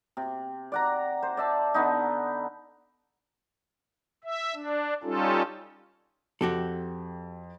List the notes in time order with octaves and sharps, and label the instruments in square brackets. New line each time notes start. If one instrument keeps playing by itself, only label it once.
[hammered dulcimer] C3
D5 F#5 A#5
C5
D5 E5 A5
D3 B3 D#4
[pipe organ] E5
D4
G3 C#4 D#4 F4 A4
[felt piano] F2 [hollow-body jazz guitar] F#4 G4 A4